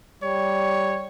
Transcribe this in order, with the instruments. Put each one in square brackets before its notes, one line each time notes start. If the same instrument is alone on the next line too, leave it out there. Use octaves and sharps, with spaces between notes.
[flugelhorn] G3 [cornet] C#5